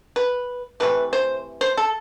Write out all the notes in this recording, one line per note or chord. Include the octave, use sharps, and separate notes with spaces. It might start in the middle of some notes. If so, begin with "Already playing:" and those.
B4
C3 E3 A3 B4
C5
C5
A4